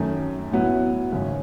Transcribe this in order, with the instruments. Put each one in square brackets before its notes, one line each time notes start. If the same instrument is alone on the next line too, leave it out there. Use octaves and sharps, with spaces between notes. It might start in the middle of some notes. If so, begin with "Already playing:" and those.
Already playing: [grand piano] F#2 D#3 A3
A2 F#3 B3 E4
G#1 F#2 C#3